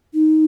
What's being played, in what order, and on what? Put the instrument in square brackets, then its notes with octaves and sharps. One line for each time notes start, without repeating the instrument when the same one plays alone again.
[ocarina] D#4